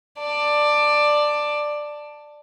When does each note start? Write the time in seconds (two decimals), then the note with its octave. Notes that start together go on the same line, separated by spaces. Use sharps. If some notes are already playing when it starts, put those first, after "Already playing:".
0.19 D5 A5